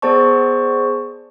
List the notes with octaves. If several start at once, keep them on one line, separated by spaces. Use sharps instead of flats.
B3 G#4 C5 D5 A5 C#6